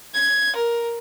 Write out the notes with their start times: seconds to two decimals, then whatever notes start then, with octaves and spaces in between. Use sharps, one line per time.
0.14 G#6
0.56 A#4